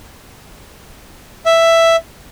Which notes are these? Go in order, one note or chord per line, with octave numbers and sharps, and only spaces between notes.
E5